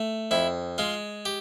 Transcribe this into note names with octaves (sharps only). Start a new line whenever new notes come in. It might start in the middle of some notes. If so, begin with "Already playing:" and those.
Already playing: A3
F2 E4
G#3 F4
G4